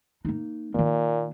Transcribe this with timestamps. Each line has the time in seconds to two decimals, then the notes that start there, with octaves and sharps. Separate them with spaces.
0.25 A#3 D#4
0.75 A#2 D#3 A#3